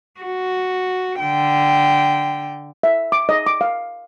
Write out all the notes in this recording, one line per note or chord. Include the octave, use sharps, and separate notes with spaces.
F#4
D3 G5
E5
D6
D#5
D6
F5